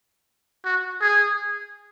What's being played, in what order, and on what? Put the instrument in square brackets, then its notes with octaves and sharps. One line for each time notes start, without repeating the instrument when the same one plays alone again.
[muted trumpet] F#4
G#4